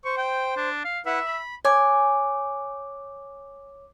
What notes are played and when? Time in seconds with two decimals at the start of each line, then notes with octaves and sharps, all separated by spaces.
0.05 C5 C#6
0.17 G5
0.57 D4
0.85 F5
1.06 E4 B4 E5 F#5
1.26 B5
1.65 C#5 G#5 D6